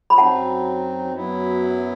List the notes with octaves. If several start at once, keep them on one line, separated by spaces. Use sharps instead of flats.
B5
F#2 F#3 C4 D#4 F#5 A5
F#2 F#3 B3 E4